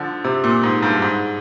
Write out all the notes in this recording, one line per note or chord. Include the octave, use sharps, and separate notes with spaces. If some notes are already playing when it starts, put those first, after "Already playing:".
Already playing: D3 F3
C3
A#2
G#2
G2
G#2